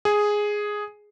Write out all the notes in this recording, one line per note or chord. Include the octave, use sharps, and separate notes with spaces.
G#4